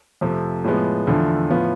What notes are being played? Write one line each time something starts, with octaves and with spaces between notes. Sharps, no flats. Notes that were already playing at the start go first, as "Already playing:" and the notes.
F2 C3 F3 A3
A2 F3 G#3 B3
E2 D3 F3 A3 E4
A2 F3 B3 F4